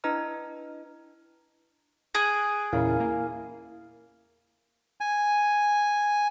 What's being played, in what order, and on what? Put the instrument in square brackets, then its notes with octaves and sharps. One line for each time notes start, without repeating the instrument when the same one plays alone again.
[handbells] D4 E4 B4 D#5 A#5 F6
[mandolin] G#4 [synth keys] F#6 D7
[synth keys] E2 A#2 C#3 [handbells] E4 A#4 F5
[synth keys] A#3
[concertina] G#5